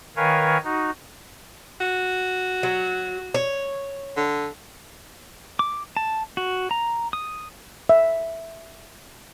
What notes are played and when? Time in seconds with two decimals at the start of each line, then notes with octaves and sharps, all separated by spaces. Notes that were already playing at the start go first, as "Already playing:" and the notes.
0.17 D#3 A#4 B4 C#5 F5 G#5
0.64 D#4 F#4
1.80 F#4
2.63 F#3
3.34 C#5
4.16 D3
5.59 D6
5.97 A5
6.37 F#4
6.71 A#5
7.13 D#6
7.89 E5